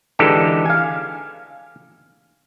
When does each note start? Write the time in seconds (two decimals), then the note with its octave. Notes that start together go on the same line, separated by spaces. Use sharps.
0.19 D3 E3 G#3 D#4 G4 A4
0.66 F5 G#5